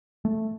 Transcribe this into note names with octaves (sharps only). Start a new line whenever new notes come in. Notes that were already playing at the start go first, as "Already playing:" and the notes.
A3